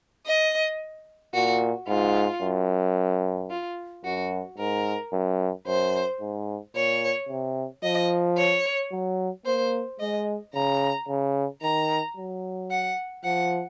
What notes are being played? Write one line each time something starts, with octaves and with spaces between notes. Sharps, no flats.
D#5
A#2 F#4
G#2 F4
F#2
F4
F#2 F#4
G#2 A#4
F#2
F#2 C5
G#2
A#2 C#5
C3
F3 D#5
C#5
F#3
A#3 C5
G#3 D#5
C#3 A#5
C#3
D#3 A#5
F#3
F#5
F3 F#5